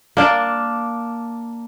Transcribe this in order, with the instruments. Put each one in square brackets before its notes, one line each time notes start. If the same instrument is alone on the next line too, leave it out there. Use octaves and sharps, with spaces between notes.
[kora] A#3 D4 F5